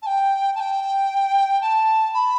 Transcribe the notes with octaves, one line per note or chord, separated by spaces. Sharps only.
A5
G5
A5
G5
A5
B5